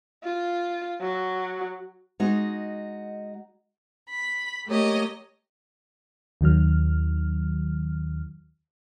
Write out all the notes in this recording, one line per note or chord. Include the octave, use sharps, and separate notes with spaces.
F4
F#3
G#3 D#4 F#4 D#5
B5
A3 A#3 G4 C#5 D#5
D#2 D#3 F#3 F6